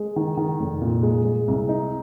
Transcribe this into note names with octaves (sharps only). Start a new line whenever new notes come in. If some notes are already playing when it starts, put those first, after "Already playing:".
Already playing: G#3
D#3
D#3
F1
A#2
G#3
G#3
C2
D#4